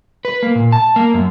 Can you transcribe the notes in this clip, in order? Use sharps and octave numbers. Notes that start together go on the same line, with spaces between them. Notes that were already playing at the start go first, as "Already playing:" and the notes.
B4
A#3
A#2
A5
A#3
F#2